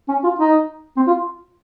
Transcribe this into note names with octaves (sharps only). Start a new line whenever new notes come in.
C#4
F4
D#4
C4
F4